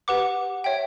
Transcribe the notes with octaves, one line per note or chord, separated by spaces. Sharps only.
G4 B4 F#5 D6
C#5 E5 G5